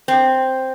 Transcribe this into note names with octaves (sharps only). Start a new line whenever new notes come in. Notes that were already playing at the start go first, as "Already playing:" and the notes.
C4